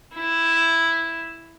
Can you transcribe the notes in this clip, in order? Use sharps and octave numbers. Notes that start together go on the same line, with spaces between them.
E4